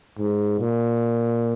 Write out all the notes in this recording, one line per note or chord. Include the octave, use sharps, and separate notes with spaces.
G#2
A#2